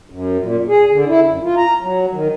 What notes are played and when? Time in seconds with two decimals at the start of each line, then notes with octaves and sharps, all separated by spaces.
0.10 F#2
0.39 A#2
0.68 G#4
0.91 D3
1.07 E4
1.27 F#2
1.43 F4
1.57 A#5
1.81 F#3
2.12 D#3